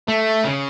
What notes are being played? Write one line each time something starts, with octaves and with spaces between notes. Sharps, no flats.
A3
C#3